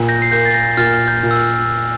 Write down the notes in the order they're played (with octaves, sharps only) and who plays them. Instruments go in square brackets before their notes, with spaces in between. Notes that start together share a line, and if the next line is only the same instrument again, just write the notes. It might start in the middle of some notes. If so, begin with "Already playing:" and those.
Already playing: [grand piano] A#2
[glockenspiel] G6 A#6
C7
[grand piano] A#3 [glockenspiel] G6 A#6
[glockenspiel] A6
G6 A#6
[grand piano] A#2 [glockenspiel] F6 A6
[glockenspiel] G6
[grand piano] A#2
[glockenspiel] E6
F6